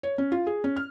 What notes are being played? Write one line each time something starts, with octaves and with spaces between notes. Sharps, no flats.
C#5
C#4
F4
G#4
C#4
F6